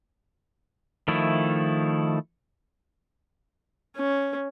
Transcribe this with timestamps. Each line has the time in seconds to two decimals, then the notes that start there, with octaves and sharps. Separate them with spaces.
1.08 D#3 F3 A3 E4
3.97 C#4